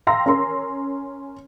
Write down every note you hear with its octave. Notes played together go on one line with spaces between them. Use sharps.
F5 G5 A#5 C6 E6 A#6
C#4 A#4 C6